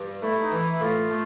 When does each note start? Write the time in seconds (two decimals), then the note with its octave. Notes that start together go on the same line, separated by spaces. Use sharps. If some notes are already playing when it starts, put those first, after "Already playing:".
Already playing: G2
0.22 A3 E4
0.40 D#4
0.51 E3 E4
0.72 E4
0.80 A2 F4
1.10 A3